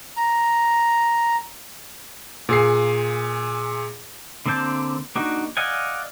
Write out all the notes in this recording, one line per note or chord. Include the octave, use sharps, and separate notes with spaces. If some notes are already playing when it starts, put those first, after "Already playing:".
A#5
A#2 G#4 C7
D3 A#3 C4 A5 G6
A#3 D4 D#4 F#4
D5 D#5 F5 F#5 G#5